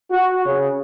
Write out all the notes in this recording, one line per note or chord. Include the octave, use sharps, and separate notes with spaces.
F#4
C#3